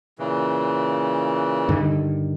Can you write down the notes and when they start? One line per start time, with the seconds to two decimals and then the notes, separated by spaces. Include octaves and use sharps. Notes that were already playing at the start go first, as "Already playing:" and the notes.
0.19 A#2 C#3 E3
1.69 G2 D3 D#3